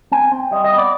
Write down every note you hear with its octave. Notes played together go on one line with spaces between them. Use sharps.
C4 G#5
C4
G3 D#5
D#5
B3
D5